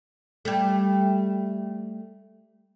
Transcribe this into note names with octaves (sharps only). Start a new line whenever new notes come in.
G3 A3